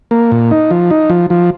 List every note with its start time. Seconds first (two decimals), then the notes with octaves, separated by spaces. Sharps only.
0.11 A#3
0.32 A#2
0.51 D#4
0.71 F3
0.90 D#4
1.10 F3
1.30 F3